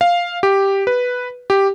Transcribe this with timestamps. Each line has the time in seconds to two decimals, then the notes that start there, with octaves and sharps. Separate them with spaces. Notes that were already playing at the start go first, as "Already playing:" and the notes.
0.01 F5
0.43 G4
0.87 B4
1.50 G4